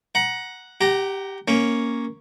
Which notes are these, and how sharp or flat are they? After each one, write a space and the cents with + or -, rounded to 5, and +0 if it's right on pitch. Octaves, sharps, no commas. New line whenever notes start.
F#5 +0 A#5 +25
G4 +0 F#5 +40 A#5 +0
A#3 +0 C#4 +0